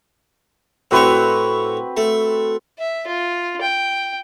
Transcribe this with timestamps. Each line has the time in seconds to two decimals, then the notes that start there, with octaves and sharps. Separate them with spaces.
0.91 A2 C4 E4 F#4 B4 C#5
1.97 A3
2.78 E5
3.07 F4
3.61 G5